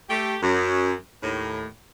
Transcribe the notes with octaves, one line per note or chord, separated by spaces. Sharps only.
A3 G4
F#2
D#2 A2